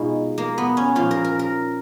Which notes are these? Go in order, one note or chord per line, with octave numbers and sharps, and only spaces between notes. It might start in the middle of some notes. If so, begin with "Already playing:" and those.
Already playing: B2 G#3 D#4 F4
A#3
B3
C#4
A#2 F3 F4
A#4
A#4
A#4